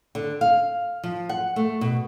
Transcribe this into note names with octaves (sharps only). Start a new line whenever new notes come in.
D3
F5
F3
F#5
A3
B2